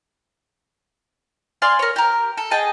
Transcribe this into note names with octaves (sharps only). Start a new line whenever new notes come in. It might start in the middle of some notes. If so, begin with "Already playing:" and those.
D5 F5 G#5 C6
A#4 C#5
G4 A#4
A4
G#4 D#5 G5 A5